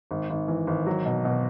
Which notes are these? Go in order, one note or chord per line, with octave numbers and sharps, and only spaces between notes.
G#1
G#1
E3
G#1
F#3
B2
B2